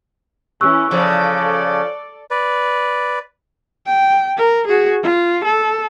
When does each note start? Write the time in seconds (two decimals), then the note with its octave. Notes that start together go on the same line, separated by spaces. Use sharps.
0.61 E3 C#4 E4 C#6 E6 F#6
0.91 C#3 F3 A4 D5
2.31 B4 D5
3.86 G5
4.37 A#4
4.68 F#4 G#4
5.03 F4
5.44 A4